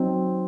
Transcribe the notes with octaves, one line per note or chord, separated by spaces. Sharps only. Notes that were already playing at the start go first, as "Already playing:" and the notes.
Already playing: F#3 C4 D#4